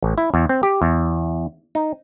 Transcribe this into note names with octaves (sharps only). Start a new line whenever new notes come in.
A1
E4
E2
C4
G4
E2
D#4